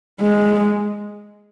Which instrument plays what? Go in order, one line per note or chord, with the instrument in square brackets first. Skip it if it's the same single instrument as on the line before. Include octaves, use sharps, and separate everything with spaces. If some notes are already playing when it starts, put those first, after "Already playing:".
[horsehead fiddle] G#3